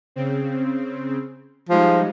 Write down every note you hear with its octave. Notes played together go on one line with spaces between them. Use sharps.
C#3 C4
F3 G3 G#3 D#4